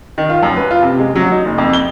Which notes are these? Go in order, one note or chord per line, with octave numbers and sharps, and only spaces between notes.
D#3
F4
F#2
B4
F4
C3
G#3
F#3
D#4
F#1
F2
G7